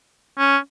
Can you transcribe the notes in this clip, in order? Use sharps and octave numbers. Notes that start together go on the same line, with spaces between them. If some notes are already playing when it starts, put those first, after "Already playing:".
C#4